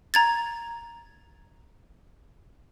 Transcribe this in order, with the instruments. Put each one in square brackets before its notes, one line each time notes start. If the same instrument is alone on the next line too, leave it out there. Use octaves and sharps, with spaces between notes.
[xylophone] A#5 G#6 A6